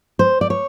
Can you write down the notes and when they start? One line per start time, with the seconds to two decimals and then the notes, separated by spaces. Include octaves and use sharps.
0.19 C5
0.41 D5
0.50 C#5